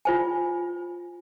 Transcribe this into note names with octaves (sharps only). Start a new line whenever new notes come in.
F4 C5 G#5